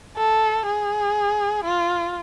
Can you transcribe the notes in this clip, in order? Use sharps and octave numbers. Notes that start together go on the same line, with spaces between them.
A4
G#4
F4